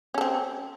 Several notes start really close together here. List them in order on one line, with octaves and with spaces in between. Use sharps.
C#4 A4 C4